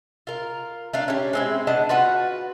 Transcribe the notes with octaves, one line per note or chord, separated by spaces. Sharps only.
F4 A#4
A3 D4 F5
C#4 G4
G#3 C4 E4
B3 D4 D#5 A5
F4 F#4 B4 F#5